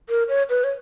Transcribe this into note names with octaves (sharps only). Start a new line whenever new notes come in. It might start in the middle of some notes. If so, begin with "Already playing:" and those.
A#4
C#5
B4
C#5